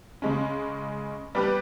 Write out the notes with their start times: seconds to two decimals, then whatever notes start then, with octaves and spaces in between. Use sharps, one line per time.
0.22 C#3 G#3 C#4
1.35 G3 B3 G4 B4